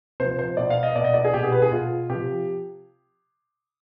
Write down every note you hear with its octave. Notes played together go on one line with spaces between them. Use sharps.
C3 F3 C5
C5
B2 D5
F5
D#5
B2 D5
D#5
D5
G#4
B2 G4
G#4
B4
G#4
B2 F4
C3 F3 G4